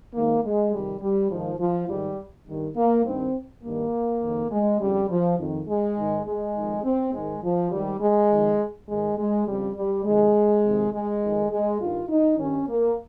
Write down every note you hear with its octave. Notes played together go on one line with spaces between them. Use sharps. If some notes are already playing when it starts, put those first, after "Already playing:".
G#2 D#3 A#3
G#3
F2 C3 D#3 G3
G3
G#2 D#3 F3
F3
G#2 D#3 G3
G2 D#3
A#3
G2 D#3 C4
G2 D#3 A#3
F2 D#3
G#3
F2 C#3 G3
F3
F2 D#3
G#3
G#2 D#3
G#3
F2 D#3
C4
G#2 D#3 G#3
F3
G#2 D#3 G3
G#3
F2 D#3
G#2 D#3 G#3
G#3
F2 C#3 G3
G3
F2 C3 D#3 G#3
F2 C3 D#3
G#3
F2 D#3
G#3
G2 D#3 F4
D#4
G2 D#3 C#4
A#3